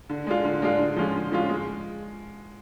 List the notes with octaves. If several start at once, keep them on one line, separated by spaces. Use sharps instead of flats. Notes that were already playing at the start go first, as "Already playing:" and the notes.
D3
G#3 D4 F4
D3
G#3 D4 F4
D3
F3 G#3 C#4 F4
D3
F3 G#3 C#4 F4
G#3